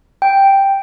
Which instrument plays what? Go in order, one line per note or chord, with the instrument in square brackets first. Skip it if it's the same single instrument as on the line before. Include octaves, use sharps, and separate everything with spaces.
[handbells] G5